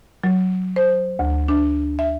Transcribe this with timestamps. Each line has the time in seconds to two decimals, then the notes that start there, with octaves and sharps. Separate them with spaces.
0.24 F#3
0.76 C5
1.19 D2
1.48 D4
1.99 E5